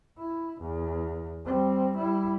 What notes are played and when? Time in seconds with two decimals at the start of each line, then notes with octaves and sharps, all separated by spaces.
0.18 E4
0.61 E2
1.45 G3 C4
1.97 G3 E4